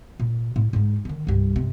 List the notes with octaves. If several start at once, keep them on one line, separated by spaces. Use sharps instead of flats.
A#2
A2
G#2 D#4
D3 D#3
C2 G2
C3